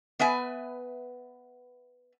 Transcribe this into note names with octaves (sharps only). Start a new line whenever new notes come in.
B3 B4 E5 G#5